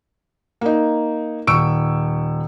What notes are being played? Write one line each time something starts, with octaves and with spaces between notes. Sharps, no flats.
A#3 D#4
D#1 C#6 E6 D7